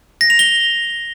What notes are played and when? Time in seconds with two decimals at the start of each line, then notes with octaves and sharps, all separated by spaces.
0.21 A#6
0.30 F7
0.39 G7